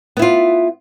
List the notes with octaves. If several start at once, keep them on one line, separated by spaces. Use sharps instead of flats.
B3 E4 F4